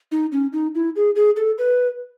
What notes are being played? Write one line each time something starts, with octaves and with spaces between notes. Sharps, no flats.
D#4
C#4
D#4
E4
G#4
G#4
A4
B4